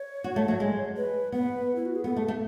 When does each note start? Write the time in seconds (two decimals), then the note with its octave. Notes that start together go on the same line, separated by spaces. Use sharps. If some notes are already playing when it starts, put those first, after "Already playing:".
Already playing: C#5
0.24 F#4
0.36 A3
0.48 F#3
0.60 G#3
0.96 B4
1.32 B3 B4
1.76 E4
1.86 F#4
1.95 G#4
2.04 B3 A4
2.17 A3
2.28 A3